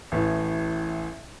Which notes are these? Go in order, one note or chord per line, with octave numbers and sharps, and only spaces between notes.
A1 A2